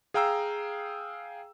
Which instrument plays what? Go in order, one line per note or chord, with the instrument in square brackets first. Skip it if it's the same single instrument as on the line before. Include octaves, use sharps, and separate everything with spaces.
[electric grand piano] G#4 F5 G5 A#5 E6